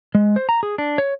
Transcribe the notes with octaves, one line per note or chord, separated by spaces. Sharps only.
G#3
C5
A#5
G#4
D4
C#5